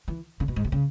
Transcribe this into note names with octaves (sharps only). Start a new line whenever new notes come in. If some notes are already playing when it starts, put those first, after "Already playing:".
E3
C#3
B2
G#2
B2
C#3